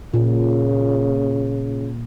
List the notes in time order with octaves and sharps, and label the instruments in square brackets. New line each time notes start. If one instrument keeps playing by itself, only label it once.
[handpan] A#2 [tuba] C#3